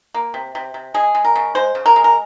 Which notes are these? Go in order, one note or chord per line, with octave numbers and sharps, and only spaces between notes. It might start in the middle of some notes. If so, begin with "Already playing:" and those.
A#3
C3
C3
C3
G#3 G#4
G#3
A#4
C#3
G#3 C5
C#3
A#4
G#3
A#4